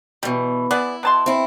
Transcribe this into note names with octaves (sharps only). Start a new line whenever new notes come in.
B2 E3 G3
B3 E4 G#4 D5
B2 A5 C6
C4 E4